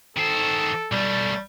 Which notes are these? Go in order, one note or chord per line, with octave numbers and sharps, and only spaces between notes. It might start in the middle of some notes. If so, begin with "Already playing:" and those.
D#3 A4 C5
B1 G3 A3